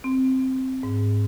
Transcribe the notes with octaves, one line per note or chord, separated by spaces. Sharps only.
C4
G#2